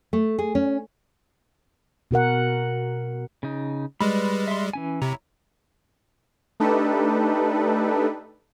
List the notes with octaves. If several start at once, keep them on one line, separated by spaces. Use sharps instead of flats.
A3
G#4
C#4
B2 F#4 A#4 F#5
C#3 D#4
G3 G#3 B4 B5
E5 C6
E3 C#4 G#5
C3 E4 C#5 A#5
A3 D4 D#4 G4 A4 B4